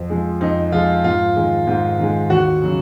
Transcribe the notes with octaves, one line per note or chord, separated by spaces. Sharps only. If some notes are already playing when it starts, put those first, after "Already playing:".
Already playing: F2
F3 G#3
F2 D#4
F3 G#3 F4
G#2 F4
D#3 G#3
G#2
D#3 G#3
D#2 F#4
C#3 F#3